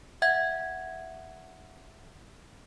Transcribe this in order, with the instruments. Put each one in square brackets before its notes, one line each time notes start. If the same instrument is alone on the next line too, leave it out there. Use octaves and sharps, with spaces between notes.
[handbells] E5 F#5 G#6